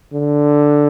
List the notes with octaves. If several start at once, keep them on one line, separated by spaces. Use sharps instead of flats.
D3